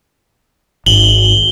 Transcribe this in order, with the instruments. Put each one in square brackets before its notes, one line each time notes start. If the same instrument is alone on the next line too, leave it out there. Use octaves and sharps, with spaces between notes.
[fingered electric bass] G#1 [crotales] F#7 G7